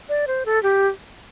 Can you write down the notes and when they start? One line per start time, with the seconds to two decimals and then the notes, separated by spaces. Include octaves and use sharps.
0.09 D5
0.27 C5
0.46 A4
0.63 G4